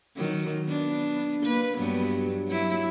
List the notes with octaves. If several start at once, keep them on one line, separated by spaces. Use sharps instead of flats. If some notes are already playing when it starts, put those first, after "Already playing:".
D#3 F#3
B3 D4
A#3 B4
G2 F#3 B3
F#3 E4